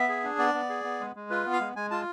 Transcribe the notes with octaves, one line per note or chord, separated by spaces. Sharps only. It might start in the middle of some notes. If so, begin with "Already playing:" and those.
Already playing: B3 E5
G#4
D4
B3 D5
B3
G#4
B3
G#3
G#3
F4 B4
B3
F5
G#3
G#3 G#5
F4 A5